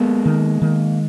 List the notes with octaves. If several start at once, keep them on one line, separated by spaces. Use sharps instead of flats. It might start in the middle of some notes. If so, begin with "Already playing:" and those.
Already playing: G#3 A#3 B3
D#3
D#3